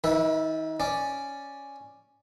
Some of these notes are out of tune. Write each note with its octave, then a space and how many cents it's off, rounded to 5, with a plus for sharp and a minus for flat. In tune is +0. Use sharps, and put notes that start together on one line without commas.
D#3 +35 B4 -20 E5 +0
C#4 +0 D5 +0